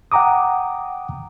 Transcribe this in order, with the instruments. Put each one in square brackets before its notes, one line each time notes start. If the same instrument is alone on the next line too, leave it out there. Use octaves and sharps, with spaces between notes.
[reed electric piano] F#5 G5 A#5 D6 D#6